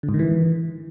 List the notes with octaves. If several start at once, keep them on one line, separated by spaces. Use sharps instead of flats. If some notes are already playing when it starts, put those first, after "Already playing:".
D3
G#2
D#3
E3